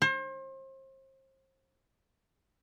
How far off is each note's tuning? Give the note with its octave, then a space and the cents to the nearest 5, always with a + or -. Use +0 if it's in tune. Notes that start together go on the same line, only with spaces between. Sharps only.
C5 +35